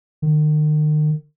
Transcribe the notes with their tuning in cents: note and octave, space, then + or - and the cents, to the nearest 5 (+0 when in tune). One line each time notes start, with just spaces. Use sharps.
D#3 -40